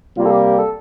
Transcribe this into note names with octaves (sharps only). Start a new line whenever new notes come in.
C3 G3 A#3 F4
A4
G4
G4
A4